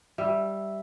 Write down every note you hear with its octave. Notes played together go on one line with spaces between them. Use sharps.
G3 E5